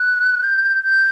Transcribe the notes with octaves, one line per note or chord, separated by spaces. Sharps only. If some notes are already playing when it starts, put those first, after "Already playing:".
Already playing: F#6
G6
G6